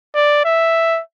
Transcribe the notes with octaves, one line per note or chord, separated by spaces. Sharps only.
D5
E5